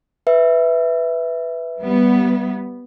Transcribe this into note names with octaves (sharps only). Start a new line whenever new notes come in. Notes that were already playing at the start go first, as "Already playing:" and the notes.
B4 E5
G3 B3